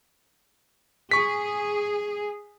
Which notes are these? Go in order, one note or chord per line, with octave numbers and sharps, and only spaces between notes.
G#4 C#6 B6